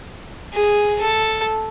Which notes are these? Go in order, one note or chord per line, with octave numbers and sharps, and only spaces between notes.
G#4
A4